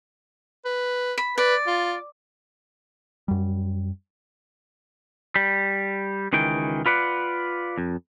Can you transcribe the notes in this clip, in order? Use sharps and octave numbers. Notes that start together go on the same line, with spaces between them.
B4
B5
B4 D5
F4
F#2 G3
G3
C#2 D#3 E3 G5
F4 B4 D5 F#5
F2